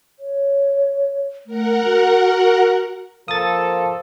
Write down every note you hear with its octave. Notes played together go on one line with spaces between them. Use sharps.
C#5
A3 A#4 F#5
F#4
F3 A#3 A4 D#6 A6